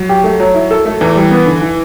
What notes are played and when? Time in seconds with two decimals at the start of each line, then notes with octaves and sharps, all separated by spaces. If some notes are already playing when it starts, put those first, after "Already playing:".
Already playing: F#3
0.09 G4
0.24 A3
0.40 F#3
0.54 E4
0.71 A4
0.85 A3
1.01 E2 E3
1.16 G3
1.31 B3
1.46 D3
1.61 E3